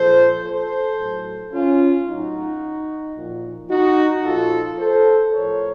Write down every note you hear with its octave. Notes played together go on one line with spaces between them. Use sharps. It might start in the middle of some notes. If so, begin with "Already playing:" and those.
Already playing: A#2 F3 A4 C5
A4 C5
A2 F#3
C#4 F4
A2 F#3 D#4 F#4
A#2 F3
D#4 F#4
A#2 F3 F4 A4
A4 C5
A2 F3 A#4 C#5